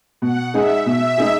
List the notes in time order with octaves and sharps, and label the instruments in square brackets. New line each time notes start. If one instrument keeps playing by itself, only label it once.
[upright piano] B2 [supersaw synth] F#5
[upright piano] G#3 D#4 G#4 [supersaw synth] E5
[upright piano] B2 [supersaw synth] E5
[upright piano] G#3 D#4 G#4